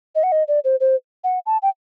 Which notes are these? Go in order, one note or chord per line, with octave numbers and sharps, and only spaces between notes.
D#5
F#5
D#5
D5
C5
C5
F#5
A5
G5